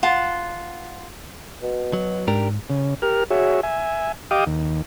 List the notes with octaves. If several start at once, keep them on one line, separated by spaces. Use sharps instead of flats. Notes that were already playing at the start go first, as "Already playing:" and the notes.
F4 F#5 A5
B2
F#3
G#2 D4 G4 A#4
C#3
G4 A#4 F6
F#4 G#4 C#5 E5
E5 G#5
G4 D#5 F5 G5 D6 D#6
D#2